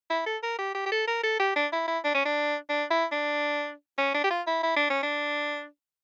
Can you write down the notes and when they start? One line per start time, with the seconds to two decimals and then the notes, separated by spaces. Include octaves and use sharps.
0.10 E4
0.26 A4
0.43 A#4
0.59 G4
0.75 G4
0.86 G4
0.92 A4
1.07 A#4
1.24 A4
1.40 G4
1.56 D4
1.72 E4
1.88 E4
2.04 D4
2.14 C#4
2.25 D4
2.69 D4
2.90 E4
3.12 D4
3.98 C#4
4.14 D4
4.24 G4
4.30 F4
4.47 E4
4.63 E4
4.76 D4
4.90 C#4
5.03 D4